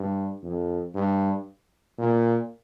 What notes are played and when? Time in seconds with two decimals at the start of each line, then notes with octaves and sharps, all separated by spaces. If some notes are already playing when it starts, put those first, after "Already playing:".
Already playing: G2
0.43 F2
0.95 G2
1.98 A#2